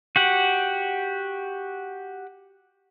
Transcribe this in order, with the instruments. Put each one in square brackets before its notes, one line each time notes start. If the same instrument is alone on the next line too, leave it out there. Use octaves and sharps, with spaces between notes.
[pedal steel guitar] F#4 G4 F#5